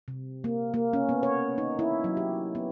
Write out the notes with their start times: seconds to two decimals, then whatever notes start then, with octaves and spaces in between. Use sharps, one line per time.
0.08 C3
0.44 A#3
0.74 A#3
0.93 C#4
1.09 B3
1.23 C#5
1.58 D#4
1.79 E4
2.04 F#3
2.17 G4
2.55 B3